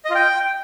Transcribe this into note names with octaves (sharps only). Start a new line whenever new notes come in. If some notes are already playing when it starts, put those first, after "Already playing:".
D#5
F4
G5